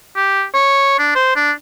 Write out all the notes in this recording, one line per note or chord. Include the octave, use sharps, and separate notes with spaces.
G4
C#5
D4
C5
D4